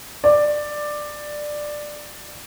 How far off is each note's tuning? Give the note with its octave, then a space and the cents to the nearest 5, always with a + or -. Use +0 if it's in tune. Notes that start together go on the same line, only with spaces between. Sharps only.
D5 +10